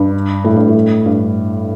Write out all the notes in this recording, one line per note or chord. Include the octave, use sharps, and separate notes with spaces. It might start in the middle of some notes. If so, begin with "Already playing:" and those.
Already playing: G2
A2
G2
A2
G2